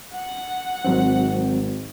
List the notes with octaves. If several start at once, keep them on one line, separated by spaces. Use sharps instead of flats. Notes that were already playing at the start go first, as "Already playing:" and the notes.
F#5
G#1 F#3 C4